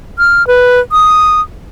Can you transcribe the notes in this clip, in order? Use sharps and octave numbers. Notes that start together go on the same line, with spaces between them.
F6
B4
D#6